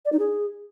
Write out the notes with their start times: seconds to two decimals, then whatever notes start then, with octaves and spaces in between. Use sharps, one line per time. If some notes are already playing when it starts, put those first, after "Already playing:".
0.05 D5
0.12 D#4
0.19 G#4